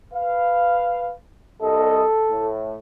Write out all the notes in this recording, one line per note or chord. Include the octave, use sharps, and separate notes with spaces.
B4 F5
C2 A4 D#5
A2